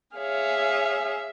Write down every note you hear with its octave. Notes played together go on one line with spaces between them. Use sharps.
G#4 C#5 E5 F5